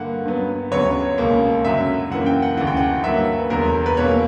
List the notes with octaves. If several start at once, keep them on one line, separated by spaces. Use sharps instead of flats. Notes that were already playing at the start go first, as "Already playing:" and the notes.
Already playing: G2 D3 A#3 F#5
G2 F#3 B3
D2 C#3 F#3 B3 C#5
C#2 B2 A#3
F#2 D3 F#3 E5
F#2 E3 A#3 F#5
G5
F#5
D2 C#3 E3 F#5
G5
F#5
G2 F#3 A#3 E5
B4
E2 D3 F#3 A#4
B4
E2 B2 A#3 C#5